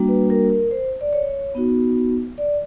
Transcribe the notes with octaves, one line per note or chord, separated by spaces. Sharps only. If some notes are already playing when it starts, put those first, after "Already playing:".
Already playing: G3 A#3 D4 F#4
B4
A#4
A#4
C5
D5
C#5
B3 D#4 F#4
D5